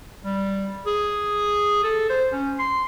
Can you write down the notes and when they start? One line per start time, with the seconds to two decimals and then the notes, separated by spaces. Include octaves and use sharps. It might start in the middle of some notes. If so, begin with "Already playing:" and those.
0.23 G3
0.87 G#4
1.84 A4
2.10 C5
2.33 C#4
2.59 C6